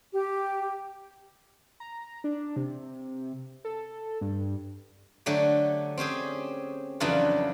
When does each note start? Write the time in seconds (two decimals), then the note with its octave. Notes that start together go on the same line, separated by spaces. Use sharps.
0.13 G4
1.80 A#5
2.24 D4
2.56 C3
3.65 A4
4.21 G2
5.26 D3 F#3 A3 G4
5.97 C4 C#4 G4 G#4
7.00 F2 C#3 E3 F#3 D4 F4